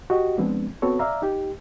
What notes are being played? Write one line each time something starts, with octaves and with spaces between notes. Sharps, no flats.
F#4 G4 D#5
F3 G#3 B3 C4 D4
B3 C4 F#4 A4 C#5
D5 E5 F5 A#5
D#4 G4